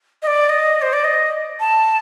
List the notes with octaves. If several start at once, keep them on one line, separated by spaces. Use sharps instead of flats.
D#5
D5
D#5
C5
D5
D#5
A5